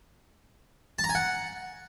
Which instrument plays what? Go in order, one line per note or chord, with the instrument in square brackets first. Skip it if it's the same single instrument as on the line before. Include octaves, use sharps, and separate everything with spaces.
[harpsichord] A5
A#5
G#5
F#5